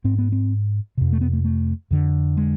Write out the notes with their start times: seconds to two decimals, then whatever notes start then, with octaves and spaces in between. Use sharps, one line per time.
0.04 G#2 C4
0.18 B3
0.32 C4
0.97 F2 C3
1.12 A3
1.21 B3
1.33 A3
1.45 A3
1.91 F2 D3
2.37 G#3